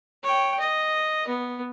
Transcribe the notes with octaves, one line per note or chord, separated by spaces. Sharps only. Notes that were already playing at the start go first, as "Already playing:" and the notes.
C#5 G5
D#5
B3